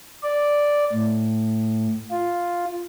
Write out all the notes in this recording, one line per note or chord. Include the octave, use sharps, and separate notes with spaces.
D5
A2
F4